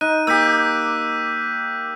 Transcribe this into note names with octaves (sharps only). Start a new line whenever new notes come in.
D#4 F#6 D#7
A#3 G4 E6 G6 B6